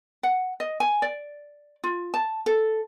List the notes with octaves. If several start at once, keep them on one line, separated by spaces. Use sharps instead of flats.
F#5
D#5
G#5
D5
F4
A5
A4